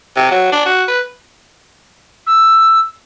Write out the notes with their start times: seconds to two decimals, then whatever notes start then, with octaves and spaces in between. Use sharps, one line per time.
0.16 C3
0.31 F#3
0.52 D4
0.65 F#4
0.88 B4
2.26 E6